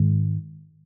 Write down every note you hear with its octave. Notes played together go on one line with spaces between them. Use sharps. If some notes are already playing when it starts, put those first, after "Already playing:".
Already playing: G#2 D#3 G#3